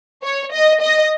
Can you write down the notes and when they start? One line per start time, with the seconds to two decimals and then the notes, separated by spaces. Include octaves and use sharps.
0.24 C#5
0.53 D#5
0.81 D#5